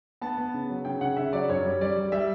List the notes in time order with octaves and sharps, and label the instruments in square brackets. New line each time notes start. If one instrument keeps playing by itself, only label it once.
[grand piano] B3 A5
B3
C#3
F#3
C#3 G5
C#3 F#5
C#3 E5
F#3 D5
F#2 C#5
G3
G3 D5
G3
G3 E5